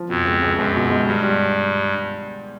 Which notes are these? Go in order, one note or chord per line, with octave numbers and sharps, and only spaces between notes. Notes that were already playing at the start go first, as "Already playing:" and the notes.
Already playing: F3
F2 B2
C#2
C#2
C#2 F#2
B2
G#3
G2 G3
G3